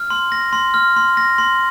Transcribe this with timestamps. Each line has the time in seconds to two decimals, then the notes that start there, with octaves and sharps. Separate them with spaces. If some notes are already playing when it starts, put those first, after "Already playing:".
Already playing: F6
0.10 C6
0.32 A#6
0.53 C6
0.74 F6
0.96 C6
1.17 A#6
1.38 C6